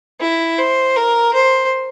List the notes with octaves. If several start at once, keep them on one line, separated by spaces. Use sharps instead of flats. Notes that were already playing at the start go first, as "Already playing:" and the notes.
E4
C5
A#4
C5